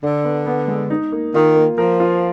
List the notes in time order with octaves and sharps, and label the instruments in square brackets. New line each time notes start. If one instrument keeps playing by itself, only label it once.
[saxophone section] D3 [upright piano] D4
[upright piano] B3
B3
G#3
D#4
A#3
[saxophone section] D#3 [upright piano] F4
[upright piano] A#3
[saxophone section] F3 [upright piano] A#4
[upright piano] F4